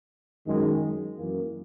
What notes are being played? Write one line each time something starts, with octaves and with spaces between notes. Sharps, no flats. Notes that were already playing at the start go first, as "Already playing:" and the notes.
F#2 D#3 G#3
F#2 E3 A#3